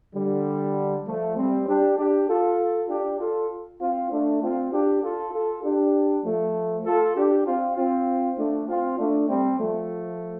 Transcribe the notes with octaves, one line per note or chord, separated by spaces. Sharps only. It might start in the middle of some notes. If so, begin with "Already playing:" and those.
D3 G3
F3 A3
G3 C4
D4 G4
D4 G4
F4 A4
D4 G4
F4 A4
C4 F4
A3 D4
C4 F4
D4 G4
F4 A4
F4 A4
D4 G4
F3 A3
F4 A4
D4 G4
C4 F4
C4 F4
A3 D4
C4 F4
A3 D4
G3 C4
F3 A3